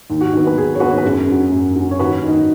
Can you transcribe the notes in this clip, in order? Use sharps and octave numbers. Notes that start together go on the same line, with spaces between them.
D#2
F#4
D#3 F#3 B3
B4
D#2 G#4
C#5
D#3 F#3 B3 F#4 B4
B4
F#2 G#4
F#3 C#4
F#2
F#3 C#4
C#5
D#2 F#4 B4
D#3 F#3 D#4